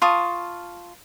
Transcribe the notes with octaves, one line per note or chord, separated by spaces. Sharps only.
F4 A5 C#6 D#6